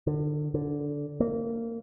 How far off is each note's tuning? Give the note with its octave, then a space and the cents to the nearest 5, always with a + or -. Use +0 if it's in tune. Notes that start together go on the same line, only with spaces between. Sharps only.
D3 +30
D3 -10
A#3 -20